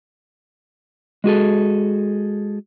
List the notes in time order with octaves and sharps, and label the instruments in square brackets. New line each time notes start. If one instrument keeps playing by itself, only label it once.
[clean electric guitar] G#3 F#4 G#4 A4